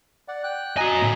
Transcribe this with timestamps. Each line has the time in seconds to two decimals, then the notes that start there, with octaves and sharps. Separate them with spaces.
0.28 D5 F#5
0.44 G5 F#6
0.78 F#4 D#5 G#5 A#5
1.01 A2